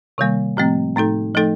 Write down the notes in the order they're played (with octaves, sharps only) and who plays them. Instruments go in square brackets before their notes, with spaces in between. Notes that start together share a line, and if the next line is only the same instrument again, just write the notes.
[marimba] C3 D#3 G3 A#3
A2 F3 A3 C4
A2 A3 D#4 A4
F3 A3 D#4 A4